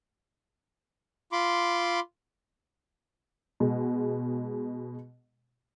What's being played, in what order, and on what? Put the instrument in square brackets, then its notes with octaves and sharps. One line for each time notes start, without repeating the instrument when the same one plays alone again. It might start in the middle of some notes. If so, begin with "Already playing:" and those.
[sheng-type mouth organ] F4 B5 C6 D6
[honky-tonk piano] B2 G#3